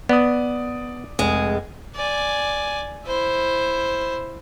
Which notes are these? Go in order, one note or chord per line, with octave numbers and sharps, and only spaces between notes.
B3 D5 D#6
F1 G#3 G#4
D5 G#5
E4 C5